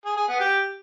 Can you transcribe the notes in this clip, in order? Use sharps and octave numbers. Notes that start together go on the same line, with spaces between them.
G#4
G#4
B3
G4